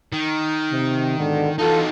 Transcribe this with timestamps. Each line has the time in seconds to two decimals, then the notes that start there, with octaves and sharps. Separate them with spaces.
0.13 D#3
0.71 C3
1.17 G#2 B2 D3
1.59 E3 D#4 F4 F#4 A4